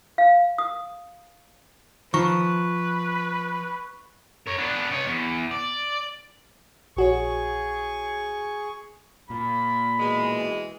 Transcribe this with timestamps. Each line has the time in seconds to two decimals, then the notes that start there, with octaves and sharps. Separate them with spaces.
0.18 F5
0.58 D#6
2.14 D#3 F3 B4 A#5 C#6 C#7
4.47 A#4 C#5
4.58 B3 D4
4.92 C#5 D#5
5.06 E2
5.51 D5
6.96 A#1 F#4 G#4 C#5 C#6
9.30 A#2 B5
10.00 B2 E3 G#3